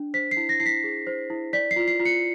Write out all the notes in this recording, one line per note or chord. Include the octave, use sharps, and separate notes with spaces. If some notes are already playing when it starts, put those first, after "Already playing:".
Already playing: D4
C5 B6
C7
E4
A#6
E4 C7
B6
G#4
C5
E4
D5 B6
C7
F4
C7
F4
C#7